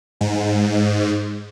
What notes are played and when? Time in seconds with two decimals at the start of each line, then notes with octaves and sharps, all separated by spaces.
0.21 G#2